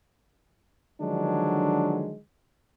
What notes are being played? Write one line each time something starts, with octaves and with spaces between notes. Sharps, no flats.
D3 D#3 F3 F#3 G#3 D4